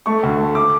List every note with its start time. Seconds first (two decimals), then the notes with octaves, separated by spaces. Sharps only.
0.06 A3 C#6
0.23 D2
0.39 A3
0.55 D6